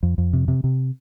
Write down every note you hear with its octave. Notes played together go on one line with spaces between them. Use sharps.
F2
F2
C3
C3
C3